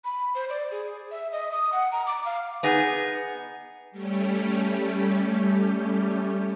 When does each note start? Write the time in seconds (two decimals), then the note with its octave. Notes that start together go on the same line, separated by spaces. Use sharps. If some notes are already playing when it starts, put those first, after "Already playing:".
0.04 B5
0.35 C5
0.50 D5
0.71 G#4
1.11 E5
1.32 D#5
1.52 D#6
1.73 F#5
1.92 A#5
2.06 D6
2.25 F5
2.63 B3 D#4 G#4
3.91 G3 A3 C#4 G4